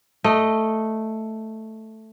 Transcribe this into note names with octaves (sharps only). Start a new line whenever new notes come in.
A3 D#5